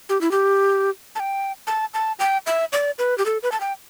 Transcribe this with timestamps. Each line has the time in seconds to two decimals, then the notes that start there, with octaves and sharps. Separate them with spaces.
0.09 G4
0.21 E4
0.31 G4
1.15 A5
1.20 G5
1.67 A5
1.94 A5
2.19 G5
2.46 E5
2.73 D5
2.99 B4
3.18 G4
3.26 A4
3.43 B4
3.52 A5
3.60 G5